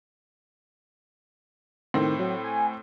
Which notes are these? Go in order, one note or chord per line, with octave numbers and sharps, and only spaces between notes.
A2 D#3 C4
F#3
G#5